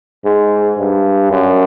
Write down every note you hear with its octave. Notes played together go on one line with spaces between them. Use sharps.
G#2
G2
F#2